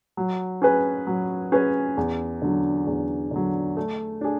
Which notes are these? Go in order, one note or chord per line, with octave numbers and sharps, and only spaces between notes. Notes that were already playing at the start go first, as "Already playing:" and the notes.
F#3
C#4 G#4 B4
F#3
C#4 G#4 B4
E2
D3 F#3
E2
D3 F#3
A3
D4 G#4